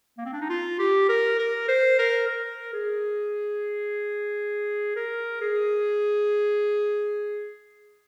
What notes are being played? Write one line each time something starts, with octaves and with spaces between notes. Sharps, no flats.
A#3
C4
D4
D#4
F4
G4
A#4
A#4
C5
A#4
A#4
G#4
A#4
G#4